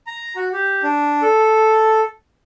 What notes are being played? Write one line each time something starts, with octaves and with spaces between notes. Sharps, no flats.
A#5
F#4
G4
D4
A4